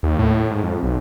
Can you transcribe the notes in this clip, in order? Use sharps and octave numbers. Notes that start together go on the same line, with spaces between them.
D#2
A2
G#2
F2
B1